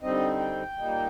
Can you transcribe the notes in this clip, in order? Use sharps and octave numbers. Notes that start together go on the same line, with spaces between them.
D3 G3 C4 D#4 D#5
G5
A#2 G3 A#3 D#4